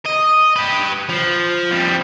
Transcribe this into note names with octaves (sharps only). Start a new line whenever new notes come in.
D#5
G4 B4
F3
F2 G3